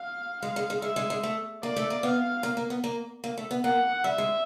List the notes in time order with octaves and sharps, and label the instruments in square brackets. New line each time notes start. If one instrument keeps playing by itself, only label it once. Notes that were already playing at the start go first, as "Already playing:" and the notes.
Already playing: [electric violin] F5
[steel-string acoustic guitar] G#3 [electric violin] F5
[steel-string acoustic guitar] G#3
G#3
[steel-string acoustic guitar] G#3 [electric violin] E5
[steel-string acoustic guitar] G#3
G#3
A3
[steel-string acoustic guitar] A#3 [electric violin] D5
[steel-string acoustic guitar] A3
A#3
[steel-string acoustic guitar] B3 [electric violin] F5
[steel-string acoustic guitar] A#3
A#3
B3
A#3
A#3
A3
B3
[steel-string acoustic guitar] A#3 [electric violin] F#5
[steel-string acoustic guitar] G3 [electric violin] E5
[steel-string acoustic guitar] G#3